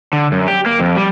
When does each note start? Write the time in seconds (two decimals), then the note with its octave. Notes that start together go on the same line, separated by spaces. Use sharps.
0.13 D3
0.32 F#2
0.48 G4
0.66 A#3
0.79 F2
0.97 G3